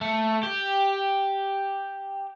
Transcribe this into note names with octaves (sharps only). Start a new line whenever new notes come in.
A3
G4